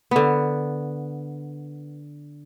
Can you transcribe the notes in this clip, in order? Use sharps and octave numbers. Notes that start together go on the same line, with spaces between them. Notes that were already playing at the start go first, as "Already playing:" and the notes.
D3 B3